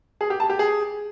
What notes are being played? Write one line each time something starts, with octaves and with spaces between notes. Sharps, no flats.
G#4
G4
A5
G4
G#4